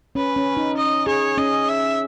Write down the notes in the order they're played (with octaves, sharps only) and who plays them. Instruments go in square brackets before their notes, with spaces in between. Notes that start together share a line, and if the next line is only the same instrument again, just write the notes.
[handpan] C#4 [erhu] B4
[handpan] C#4
D#4
[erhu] D#5
[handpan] G#4 [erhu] C#5
[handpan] C#4 [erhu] D#5
[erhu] E5